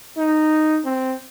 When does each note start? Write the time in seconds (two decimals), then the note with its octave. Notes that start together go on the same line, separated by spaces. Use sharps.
0.17 D#4
0.85 C4